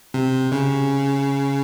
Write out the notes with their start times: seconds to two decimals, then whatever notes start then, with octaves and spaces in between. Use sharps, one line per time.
0.14 C3
0.52 C#3